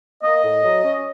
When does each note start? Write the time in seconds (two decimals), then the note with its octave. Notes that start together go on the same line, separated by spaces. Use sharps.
0.23 A#3 D#5
0.44 A2
0.64 F#3
0.83 C#4